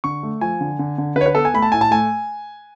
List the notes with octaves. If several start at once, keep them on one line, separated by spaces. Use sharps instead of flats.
D3 C#6
A3
F3 G#5
D3
D3
D3
D3 B4
C#5
B4
B3 A4
G#5
A3 B5
A5
A2 G#5
A5
A3 G#5